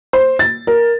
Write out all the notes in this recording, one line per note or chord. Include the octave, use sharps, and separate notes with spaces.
C5
A6
A#4